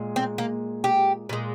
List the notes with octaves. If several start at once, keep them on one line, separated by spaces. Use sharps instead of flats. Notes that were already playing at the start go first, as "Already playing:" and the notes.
Already playing: A#2 G#3
C4
A#3
G4
A#2 G#3